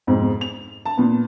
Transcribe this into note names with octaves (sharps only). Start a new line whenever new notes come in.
F2 G#2 B2
F7
A5
A#2 B3